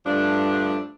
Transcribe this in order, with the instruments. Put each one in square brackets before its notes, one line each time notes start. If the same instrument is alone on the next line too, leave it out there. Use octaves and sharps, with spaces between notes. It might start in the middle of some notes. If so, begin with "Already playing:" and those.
[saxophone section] G2 F3 A3 D4